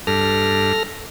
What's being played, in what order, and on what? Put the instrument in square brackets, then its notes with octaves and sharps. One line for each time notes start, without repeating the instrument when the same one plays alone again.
[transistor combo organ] G2 [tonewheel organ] A4 F6 A#6